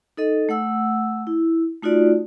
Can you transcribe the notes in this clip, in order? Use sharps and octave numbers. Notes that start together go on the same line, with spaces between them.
D#4 A4 D#5
A3 F#5 E6
E4
A3 D#4 F4 F#4 D5